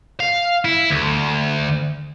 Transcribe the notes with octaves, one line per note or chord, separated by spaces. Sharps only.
F5
E4
D2